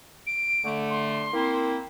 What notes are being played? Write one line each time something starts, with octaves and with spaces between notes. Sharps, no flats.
D7
D3 A3
C6
A#3 C4 E4